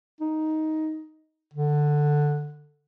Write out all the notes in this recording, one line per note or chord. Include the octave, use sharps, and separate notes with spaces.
D#4
D3